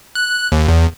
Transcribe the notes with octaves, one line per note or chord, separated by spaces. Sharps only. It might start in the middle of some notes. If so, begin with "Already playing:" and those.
F#6
D#2
E2